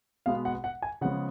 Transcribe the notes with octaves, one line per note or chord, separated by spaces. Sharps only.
B2 G#3 B3 F5
F#5
F#5
G#5
C#3 F3 G#3 B3 F#5